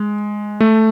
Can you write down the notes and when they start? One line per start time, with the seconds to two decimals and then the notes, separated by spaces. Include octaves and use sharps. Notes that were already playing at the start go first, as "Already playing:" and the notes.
Already playing: G#3
0.60 A3